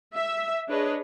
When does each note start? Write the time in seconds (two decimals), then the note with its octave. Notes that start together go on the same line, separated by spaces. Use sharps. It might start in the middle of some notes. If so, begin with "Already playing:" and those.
0.15 E5
0.68 D4 G#4 B4 C#5 D#5